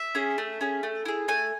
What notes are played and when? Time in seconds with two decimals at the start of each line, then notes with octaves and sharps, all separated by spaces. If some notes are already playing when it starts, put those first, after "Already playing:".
Already playing: E5
0.15 C#4 G#4
0.38 A3
0.61 C#4 G#4
0.83 A3
1.05 E4 G#4
1.28 A3 G#5